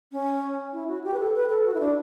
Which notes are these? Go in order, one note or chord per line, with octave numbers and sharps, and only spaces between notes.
C#4
E4
F#4
G4
B4
A4
B4
A4
F#4
E4
D4